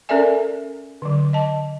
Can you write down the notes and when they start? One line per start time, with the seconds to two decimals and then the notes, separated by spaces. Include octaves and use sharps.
0.09 C#4 A4 A#4 D5 E5 G#5
1.02 D3 F#3
1.33 D#5 A5